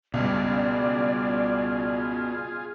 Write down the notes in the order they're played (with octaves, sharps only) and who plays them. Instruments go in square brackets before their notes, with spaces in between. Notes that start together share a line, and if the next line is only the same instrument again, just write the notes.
[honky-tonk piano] C#2 G2 [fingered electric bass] B2 [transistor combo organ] F4 G#4 [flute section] D5